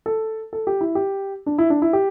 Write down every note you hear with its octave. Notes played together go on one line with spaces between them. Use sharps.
A4
A4
G4
E4
G4
D4
E4
D4
E4
G4